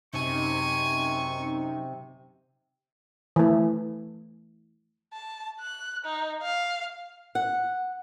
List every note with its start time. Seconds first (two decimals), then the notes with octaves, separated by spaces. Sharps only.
0.13 F#2 C3 C4 D#4 G#5 C#6
3.36 E3 A3
5.13 A5
5.60 F#6
6.04 D#4
6.42 F5
7.35 F#5